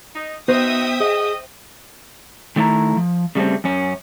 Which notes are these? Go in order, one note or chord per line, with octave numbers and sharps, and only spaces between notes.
D#4
B3 D#4 F#4 C5 E5 G5 D#6
G#4 D#5
D#3 A3 E4 D5 A#5
F3
C#3 G3 A3 C4
F#2 C#4